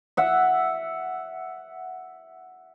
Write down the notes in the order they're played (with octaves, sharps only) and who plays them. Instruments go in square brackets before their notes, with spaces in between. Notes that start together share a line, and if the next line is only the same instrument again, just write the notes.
[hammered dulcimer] E5 F#5